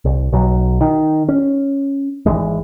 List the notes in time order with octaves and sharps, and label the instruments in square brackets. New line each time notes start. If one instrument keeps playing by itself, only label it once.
[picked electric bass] C2
B1 F#3
D#3
C#4
G#1 E2 E3 G#3